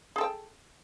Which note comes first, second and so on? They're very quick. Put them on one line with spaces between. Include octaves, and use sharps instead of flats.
G#4 A4 G5